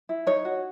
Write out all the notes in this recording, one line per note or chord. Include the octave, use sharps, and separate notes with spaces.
E4
D#4 C#5
F#4